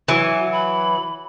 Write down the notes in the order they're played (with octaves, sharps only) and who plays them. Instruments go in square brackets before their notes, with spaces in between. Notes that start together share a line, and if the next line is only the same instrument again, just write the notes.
[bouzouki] E3 F#3 [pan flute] F#4
[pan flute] B5